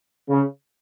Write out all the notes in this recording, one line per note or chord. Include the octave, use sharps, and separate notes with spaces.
C#3